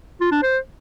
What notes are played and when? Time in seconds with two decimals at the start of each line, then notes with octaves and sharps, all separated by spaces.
0.21 F4
0.32 D4
0.43 C5